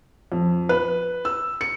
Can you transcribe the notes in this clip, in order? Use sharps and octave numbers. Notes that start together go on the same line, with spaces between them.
F2
B4
E6
C#7